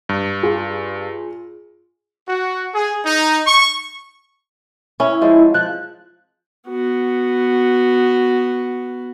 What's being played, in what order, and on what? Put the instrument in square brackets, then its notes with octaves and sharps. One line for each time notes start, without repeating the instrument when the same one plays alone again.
[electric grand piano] G2
[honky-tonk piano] F4 G#4
[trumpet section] F#4
G#4
D#4
C#6
[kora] C#4 [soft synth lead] E4
[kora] F3 G#3 C4
[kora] F3 [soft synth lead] F#6
[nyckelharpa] B3 F#4